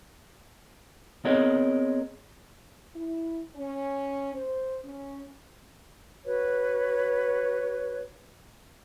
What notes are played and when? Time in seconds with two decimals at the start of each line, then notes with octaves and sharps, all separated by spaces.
1.25 B3 C4 G#4 A#4 C#5 D#5
2.95 E4
3.56 C#4
4.35 C5
4.84 C#4
6.25 F#4 B4 C#5